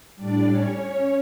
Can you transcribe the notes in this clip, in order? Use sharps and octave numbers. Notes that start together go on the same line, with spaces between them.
A2 G3 D4 D5
C#4 C#5